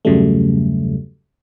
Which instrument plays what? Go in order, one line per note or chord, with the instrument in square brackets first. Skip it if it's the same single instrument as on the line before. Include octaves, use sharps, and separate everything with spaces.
[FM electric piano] E2 G2 C#3 F#3 G3 A3